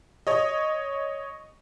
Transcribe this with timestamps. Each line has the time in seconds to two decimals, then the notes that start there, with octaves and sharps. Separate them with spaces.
0.27 C#5 D#5